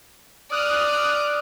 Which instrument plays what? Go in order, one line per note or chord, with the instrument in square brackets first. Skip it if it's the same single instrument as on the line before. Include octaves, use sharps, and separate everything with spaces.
[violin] D5 [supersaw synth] D#6 F6 F#6